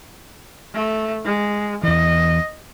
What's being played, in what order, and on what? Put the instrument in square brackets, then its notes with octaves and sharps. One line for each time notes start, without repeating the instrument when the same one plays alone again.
[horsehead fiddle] A3
G#3
[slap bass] E2 E3 [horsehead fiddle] D#5